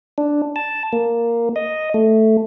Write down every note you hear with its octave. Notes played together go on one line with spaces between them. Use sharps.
D4
A5
A#3
D#5
A3